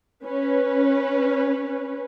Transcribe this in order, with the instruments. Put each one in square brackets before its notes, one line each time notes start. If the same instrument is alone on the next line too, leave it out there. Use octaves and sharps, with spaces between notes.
[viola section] C#4 B4